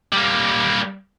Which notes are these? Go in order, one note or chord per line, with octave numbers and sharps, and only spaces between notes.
G3 A#3